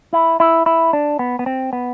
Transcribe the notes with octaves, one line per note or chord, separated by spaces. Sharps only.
E4
E4
E4
D4
B3
B3
C4
B3